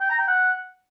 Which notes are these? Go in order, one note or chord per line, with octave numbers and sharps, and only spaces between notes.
G5
A#5
G5
F#5